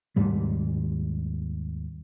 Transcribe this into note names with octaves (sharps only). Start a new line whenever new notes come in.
D#2 G#2 G3